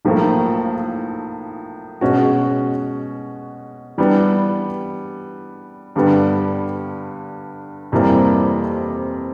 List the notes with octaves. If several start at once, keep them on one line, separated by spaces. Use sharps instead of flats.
B1 A2 F3 A#3
B2 G#3 C#4 F#4
E3 G3 B3 D4
G2 D3 G3 B3
F2 C3 E3 G3 A#3